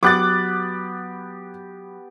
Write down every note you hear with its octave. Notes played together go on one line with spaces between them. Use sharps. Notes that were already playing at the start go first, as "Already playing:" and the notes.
F#3 B3 G4 D6 F#6 A6